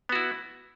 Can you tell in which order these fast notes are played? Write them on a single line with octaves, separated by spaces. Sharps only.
B3 F#4 E4